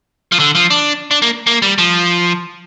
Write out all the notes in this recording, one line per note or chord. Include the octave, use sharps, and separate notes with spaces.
F3
D3
F3
D4
D4
A#3
A#3
G3
F3